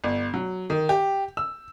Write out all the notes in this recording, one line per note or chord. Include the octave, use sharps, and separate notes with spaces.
G1
F#3
D#3
G4
E6